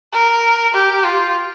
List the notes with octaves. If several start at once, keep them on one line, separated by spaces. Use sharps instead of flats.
A#4
G4
F4